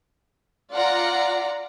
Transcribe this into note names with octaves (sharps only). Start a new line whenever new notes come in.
F4 D5 F#5 A#5